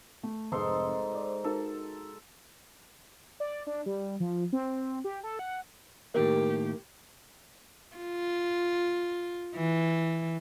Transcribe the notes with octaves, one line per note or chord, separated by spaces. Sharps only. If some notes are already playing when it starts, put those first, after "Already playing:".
A3
F1 G#2 C4 A4 C6
C5 D5
D#4 F#4 A4 A#4
D5
D4
G3
F3
C4
G4
A4
F#5
A2 D#3 A#3 G4 A#4
F4
E3